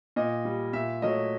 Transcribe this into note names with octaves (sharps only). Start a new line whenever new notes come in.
A#2 D#5
G3
A#2 E5
F#3 A3 D#5